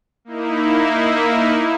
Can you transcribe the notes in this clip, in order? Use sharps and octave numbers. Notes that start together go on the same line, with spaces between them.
A#3 D#4 E4